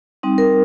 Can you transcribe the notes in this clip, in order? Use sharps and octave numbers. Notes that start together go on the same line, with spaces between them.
G3 C4 D#4
A#4